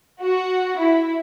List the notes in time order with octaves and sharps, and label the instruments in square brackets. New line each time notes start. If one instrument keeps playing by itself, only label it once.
[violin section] F#4
E4